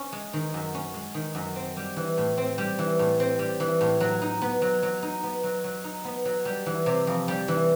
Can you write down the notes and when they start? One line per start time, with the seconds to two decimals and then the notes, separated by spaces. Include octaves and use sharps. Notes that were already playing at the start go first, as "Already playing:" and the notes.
Already playing: C#4
0.13 G#3
0.33 D#3
0.54 F#2
0.75 C#4
0.94 G#3
1.14 D#3
1.35 F#2
1.56 C4
1.77 G3
1.96 E3
2.18 A2
2.38 C4
2.58 G3
2.79 E3
2.99 A2
3.20 C4
3.39 G3
3.60 E3
3.81 A2
4.00 F#3
4.22 D#4
4.42 B3
4.62 F#3
4.83 F#3
5.03 D#4
5.23 B3
5.43 F#3
5.64 F#3
5.84 D#4
6.05 B3
6.25 F#3
6.45 G3
6.66 E3
6.86 C3
7.07 F2
7.28 G3
7.48 E3